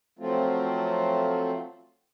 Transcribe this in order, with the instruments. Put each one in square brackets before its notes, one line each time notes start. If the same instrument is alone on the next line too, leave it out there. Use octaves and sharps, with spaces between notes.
[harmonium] F3 F#3 A3 C4 F4